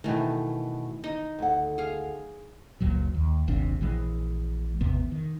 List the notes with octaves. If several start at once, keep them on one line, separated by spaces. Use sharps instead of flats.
B2 D#3 E3 A3
D#4
D2 F#5
G#4 F5
F#1 C#2 A#2 F#3
D#2
D#1 G#1 C3 D4
A#1 E3 G#3
G#1 E2 C3 B3
D#3